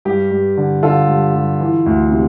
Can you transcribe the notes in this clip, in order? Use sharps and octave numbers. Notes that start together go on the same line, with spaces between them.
G2 G4
G2
D3
D3 F4 A4
G2
G2
E3
D2
C3